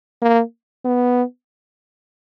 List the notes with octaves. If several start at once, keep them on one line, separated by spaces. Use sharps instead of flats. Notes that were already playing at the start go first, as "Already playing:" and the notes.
A#3
B3